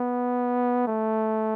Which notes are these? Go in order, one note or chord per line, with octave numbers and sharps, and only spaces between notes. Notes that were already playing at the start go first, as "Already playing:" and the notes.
Already playing: B3
A3